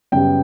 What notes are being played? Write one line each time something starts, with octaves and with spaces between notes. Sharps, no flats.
F#2 C#3 G3 B3 G5